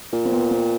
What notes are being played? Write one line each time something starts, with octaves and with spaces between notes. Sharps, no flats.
A#2
C4
B3
C4